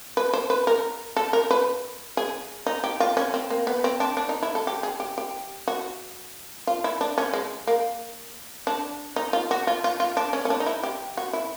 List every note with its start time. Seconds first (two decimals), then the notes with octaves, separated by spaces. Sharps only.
0.17 B4
0.33 C5
0.50 B4
0.67 A#4
1.16 A4
1.33 A#4
1.51 B4
2.17 G#4
2.66 D#4
2.84 G4
3.00 F4
3.17 C#4
3.34 C4
3.50 A#3
3.67 B3
3.84 C4
4.00 D4
4.17 D4
4.29 D#4
4.43 E4
4.55 A4
4.67 G4
4.83 G#4
5.00 G4
5.18 G4
5.68 F#4
6.67 F4
6.84 E4
7.01 D4
7.18 C#4
7.33 G#3
7.67 A#3
8.67 D4
9.16 D#4
9.33 F4
9.51 F#4
9.67 F4
9.84 F4
10.00 F4
10.17 D4
10.33 C#4
10.45 C#4
10.50 D4
10.60 D#4
10.66 E4
10.83 G4
11.17 F#4
11.33 E4